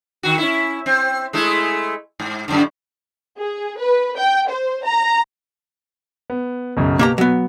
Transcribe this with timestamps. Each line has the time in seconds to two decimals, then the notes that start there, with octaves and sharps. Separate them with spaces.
0.23 D#3 F#4
0.38 C#4 E4
0.86 C4
1.33 G#3 A3 E4
2.20 G#2
2.48 F#2 A2 D3
3.39 G#4
3.79 B4
4.18 G5
4.51 C5
4.86 A#5
6.30 B3
6.77 B1 F#2 C#3
6.99 B2 A#3 G4 A#5
7.18 F#3 B3